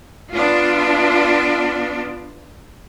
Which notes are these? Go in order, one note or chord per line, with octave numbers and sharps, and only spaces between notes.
B3 D4 F4